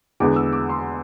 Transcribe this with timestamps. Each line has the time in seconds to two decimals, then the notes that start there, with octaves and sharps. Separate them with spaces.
0.20 E2 D3 G#3 B3 D6
0.36 E6
0.53 D6
0.69 C6